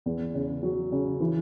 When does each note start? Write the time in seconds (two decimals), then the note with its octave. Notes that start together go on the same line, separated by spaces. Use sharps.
0.06 E2
0.35 C#3
0.63 F#3
0.92 C#3
1.20 E3